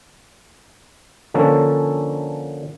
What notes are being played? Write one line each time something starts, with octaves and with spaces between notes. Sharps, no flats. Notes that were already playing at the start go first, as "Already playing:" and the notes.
D3 F3 A#3 C#4 A4